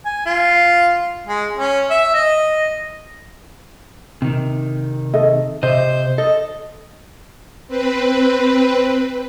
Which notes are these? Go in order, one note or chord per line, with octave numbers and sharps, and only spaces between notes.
G#5
F4
G#3
C#4
E5
D#5
C3 D#3
A4 D#5 E5
C3 C5 D#5 E5
A4 D#5
C4 B4